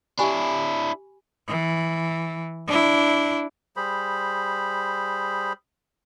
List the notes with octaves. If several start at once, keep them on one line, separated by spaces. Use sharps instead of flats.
D4 E4 G4 G#5 B5
E3
D4 E4
G3 G#4 C5 B5